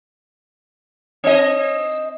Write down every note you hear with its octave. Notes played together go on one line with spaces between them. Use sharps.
C4 D#5